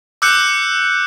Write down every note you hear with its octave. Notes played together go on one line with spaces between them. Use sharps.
D6 E6 F#6 G6 C#7